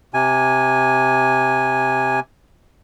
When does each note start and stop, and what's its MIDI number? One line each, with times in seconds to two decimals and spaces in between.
0.14 2.20 48
0.14 2.20 80